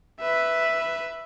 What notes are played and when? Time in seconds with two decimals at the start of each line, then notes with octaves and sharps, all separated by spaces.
0.20 B4 E5